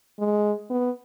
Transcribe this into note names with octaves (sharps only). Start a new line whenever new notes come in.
G#3
B3